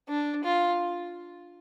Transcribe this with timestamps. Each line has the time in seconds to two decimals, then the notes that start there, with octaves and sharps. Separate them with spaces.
0.09 D4
0.44 F4